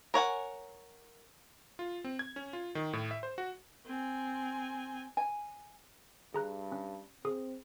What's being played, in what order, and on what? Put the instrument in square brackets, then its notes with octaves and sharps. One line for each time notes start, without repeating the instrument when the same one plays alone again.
[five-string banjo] A#4 C#5 F#5 G#5
[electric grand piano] F4
C4
G#6
C#4
F4
D#3
A2
E5
C5
F#4
[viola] C4 G#5
[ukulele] G#5
[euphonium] G2 [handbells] G#4 A#5 F#6
[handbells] C#4
[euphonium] C4 [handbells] G#4 D#6